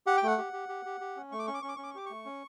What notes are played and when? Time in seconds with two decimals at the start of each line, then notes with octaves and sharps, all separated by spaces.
0.07 G4 F#5
0.17 G5
0.23 A3 F#5
0.38 G4
0.53 G4
0.69 G4
0.85 G4
1.01 G4
1.16 C#4
1.32 A3 C#6
1.39 D6
1.47 C#4 C#6
1.54 D6
1.62 C#4 C#6
1.69 D6
1.76 C#4 C#6
1.83 D6
1.90 C#6
1.95 G4 D6
2.06 A3 C#6
2.25 C#4